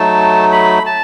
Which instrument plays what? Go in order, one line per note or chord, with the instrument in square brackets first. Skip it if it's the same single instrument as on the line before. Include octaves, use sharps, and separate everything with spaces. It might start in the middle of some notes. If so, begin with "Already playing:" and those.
Already playing: [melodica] F#3 A3 D#4 A5
B5
A5